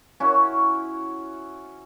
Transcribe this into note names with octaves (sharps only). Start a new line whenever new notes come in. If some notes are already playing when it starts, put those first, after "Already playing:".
C#4 E4 F#4